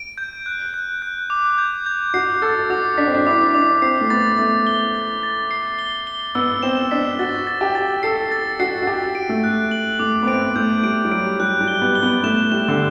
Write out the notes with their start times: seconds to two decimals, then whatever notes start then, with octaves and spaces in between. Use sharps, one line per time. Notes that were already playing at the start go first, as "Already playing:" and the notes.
Already playing: D7
0.18 G6
0.46 F#6
0.74 F#6
1.02 F#6
1.30 D6
1.58 G6
1.86 G6
2.14 F#4 C7
2.42 A4 A6
2.70 F#4 D6
2.98 D4 B6
3.07 C4
3.14 D4
3.27 E4 D6
3.54 D4 D6
3.82 C4 C7
4.01 A3
4.10 B3 A6
4.38 A3 A6
4.67 G7
4.95 A6
5.23 A6
5.51 C7
5.79 G7
6.07 G7
6.35 B3 E6
6.63 C4 E7
6.91 D4 B6
7.19 F#4 A6
7.47 A6
7.61 G4
7.75 A6
8.03 A4 C7
8.32 A6
8.60 F#4 C7
8.82 F#4
8.87 G4 A6
9.15 D7
9.29 A3
9.44 F#6
9.71 F#7
9.99 A3 D6
10.23 B3
10.27 C4 D7
10.56 A3 G6
10.83 G3 D7
11.05 G3
11.11 F#3 D7
11.40 G3 F#6
11.61 G3
11.68 G7
11.82 B3
11.95 G7
12.03 B3
12.23 A3 E7
12.52 G3 E7
12.68 D3